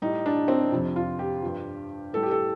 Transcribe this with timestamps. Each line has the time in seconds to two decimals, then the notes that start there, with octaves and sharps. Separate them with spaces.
0.02 A2 G3 D#4
0.26 D4
0.48 C4
0.72 F2 C3 F3
0.96 F4
1.19 G4
1.42 G2 F3
2.13 A2 G3 A4
2.23 G4
2.31 A4